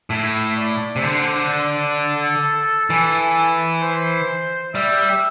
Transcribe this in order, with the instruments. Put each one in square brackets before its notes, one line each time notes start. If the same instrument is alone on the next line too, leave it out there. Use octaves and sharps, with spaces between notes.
[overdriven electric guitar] A2 [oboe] E4
[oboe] D5
[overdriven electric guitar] C3
[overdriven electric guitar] D3 [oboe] C5
[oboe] A4
[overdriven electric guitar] E3
[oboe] C5
[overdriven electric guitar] G3 [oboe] E5